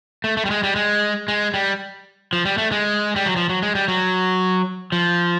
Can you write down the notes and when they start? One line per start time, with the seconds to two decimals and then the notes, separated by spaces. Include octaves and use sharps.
0.24 A3
0.37 A3
0.45 G3
0.51 G#3
0.63 G3
0.76 G#3
1.28 G#3
1.54 G3
2.33 F3
2.45 G3
2.58 A3
2.72 G#3
3.16 G3
3.26 F#3
3.36 F3
3.49 F#3
3.62 G#3
3.75 G3
3.88 F#3
4.92 F3